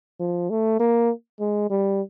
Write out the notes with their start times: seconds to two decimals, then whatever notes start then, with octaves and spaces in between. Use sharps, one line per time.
0.20 F3
0.50 A3
0.80 A#3
1.40 G#3
1.70 G3